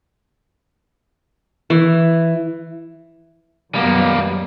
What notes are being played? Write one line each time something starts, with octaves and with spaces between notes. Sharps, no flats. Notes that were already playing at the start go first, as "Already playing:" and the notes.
E3
F#2 F#3 G3 A#3 B3